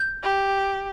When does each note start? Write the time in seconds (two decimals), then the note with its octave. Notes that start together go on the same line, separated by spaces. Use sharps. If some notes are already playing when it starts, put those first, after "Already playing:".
Already playing: G6
0.23 G4